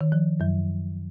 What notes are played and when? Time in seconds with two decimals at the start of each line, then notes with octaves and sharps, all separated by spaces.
0.01 D#3
0.12 F3
0.40 F#2 F#3